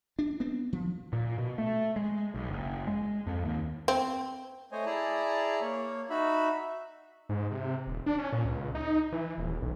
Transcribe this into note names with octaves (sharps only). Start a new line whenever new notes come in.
D4
B3 C4 D4
F3
A#2
B2
A3
G#3
B1
F#1
G#3
F2
D#2
C4
A3 C5 C#5 D#5 G#5
E4 G#4 D5 A5 A#5
A#3 C#5
D#4 F#4 E5 B5
E5
G#2
C3
D#1
D4
C#4
A#2
C#2
D#4
E3
D#1
B1